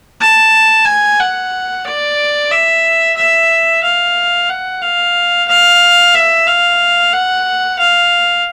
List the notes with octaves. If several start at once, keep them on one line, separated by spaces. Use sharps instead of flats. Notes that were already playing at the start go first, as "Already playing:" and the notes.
A5
G#5
F#5
D5
E5
E5
F5
F#5
F5
F5
E5
F5
F#5
F5